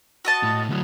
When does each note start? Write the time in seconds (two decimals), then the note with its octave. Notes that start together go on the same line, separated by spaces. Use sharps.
0.25 F#4 D#5 A5
0.43 A2
0.69 D2 F#3